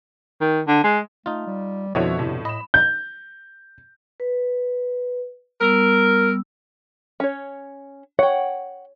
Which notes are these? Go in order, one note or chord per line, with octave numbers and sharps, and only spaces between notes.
D#3
D3
G#3
A3 D#4 F4
G3
F2 B2 D3 F3 E4 F#4 C#5
A2 C3
A2 D#5 B5 E7
G6
B4
G3 B3 A#4 E6
C#4 C#5
C#5 F#5 G5